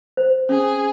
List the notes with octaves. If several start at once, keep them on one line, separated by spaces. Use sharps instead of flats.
C5
C#4 G#4